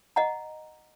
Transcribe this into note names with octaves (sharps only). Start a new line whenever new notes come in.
D#5 F#5 A#5